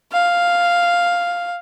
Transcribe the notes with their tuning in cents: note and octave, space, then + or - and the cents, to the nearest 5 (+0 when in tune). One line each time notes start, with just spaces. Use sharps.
F5 +0